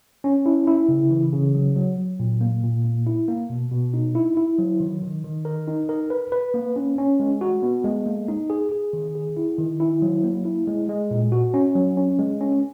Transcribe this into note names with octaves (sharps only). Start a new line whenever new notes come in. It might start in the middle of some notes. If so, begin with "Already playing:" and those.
C#4
E4
E4
C#3
E3
C#3
F#3
F#3
F#3
A#2
A#3
A#2
A#3
E4
A#3
B2
B2
D#4
E4
E4
F#3
D#3
D#3
D#3
A#4
D#4
A#4
B4
B4
A#3
C#4
C#4
G#3
F#4
B3
G#3
A#3
D#4
G#4
G#4
D#3
G#4
E4
D#3
E4
F#3
A#3
E4
G#3
G#3
A#2
F#4
C#4
F#3
C#4
G#3
C#4